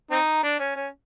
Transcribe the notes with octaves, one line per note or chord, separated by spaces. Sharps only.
C4 D#4
D4
C#4
C#4